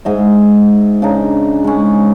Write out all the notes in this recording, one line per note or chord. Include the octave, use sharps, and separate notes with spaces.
G#2 D#5 E5
C#3 D4 D#4
G#3 C#4